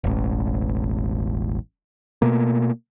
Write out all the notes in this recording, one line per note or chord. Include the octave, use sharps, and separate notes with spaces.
E1 A1
B2 A3 A#3